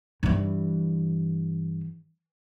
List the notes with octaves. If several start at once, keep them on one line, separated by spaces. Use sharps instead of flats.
G2 E3